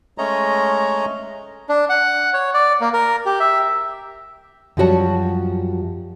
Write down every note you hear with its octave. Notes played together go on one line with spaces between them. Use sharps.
G#3 A3 C#4 C#5 D#5 A#5
D4
F#5
C#5
D5
A#3
A#4
G4
E5
F#2 F3 G3 F#4 C#5 A5